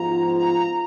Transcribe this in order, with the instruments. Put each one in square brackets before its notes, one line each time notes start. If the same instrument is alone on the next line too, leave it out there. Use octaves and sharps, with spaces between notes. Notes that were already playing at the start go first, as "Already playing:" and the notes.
Already playing: [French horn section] G#2 F3 B3 F4 [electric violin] A#5
[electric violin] A#5